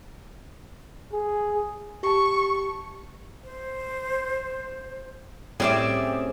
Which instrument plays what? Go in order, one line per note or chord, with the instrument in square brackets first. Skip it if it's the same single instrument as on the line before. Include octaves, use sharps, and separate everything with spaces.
[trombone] G#4
[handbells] G4 A5 [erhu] C#6
[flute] C5
[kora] A2 G3 C#4 [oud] C4 [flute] G4 [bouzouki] G#4 D5 E5